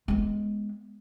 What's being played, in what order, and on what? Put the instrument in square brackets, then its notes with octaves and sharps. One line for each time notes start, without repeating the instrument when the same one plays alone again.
[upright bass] G#3 B3